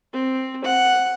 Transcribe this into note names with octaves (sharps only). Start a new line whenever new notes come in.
C4
F#5